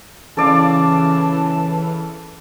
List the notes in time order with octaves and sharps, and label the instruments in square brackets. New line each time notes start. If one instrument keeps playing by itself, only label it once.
[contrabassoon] C#3 [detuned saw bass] E3 [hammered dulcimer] A4 D5 F5 [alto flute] A5